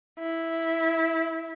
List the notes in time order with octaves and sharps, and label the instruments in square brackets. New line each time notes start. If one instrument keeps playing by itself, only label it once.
[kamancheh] E4